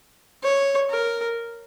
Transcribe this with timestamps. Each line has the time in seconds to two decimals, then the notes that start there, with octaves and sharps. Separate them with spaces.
0.43 C#5
0.90 A#4